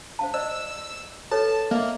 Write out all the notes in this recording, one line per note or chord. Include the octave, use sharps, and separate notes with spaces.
C5 F5 A5
C5 D5 D#5 E6
A4 B4 C#5 A5
A#3 D#5 E5